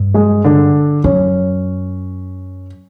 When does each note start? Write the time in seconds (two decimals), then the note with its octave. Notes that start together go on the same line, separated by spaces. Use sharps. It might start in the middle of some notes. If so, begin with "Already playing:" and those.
Already playing: G2
0.14 G#3 G#4
0.44 D3 D4
1.04 F#2 C#4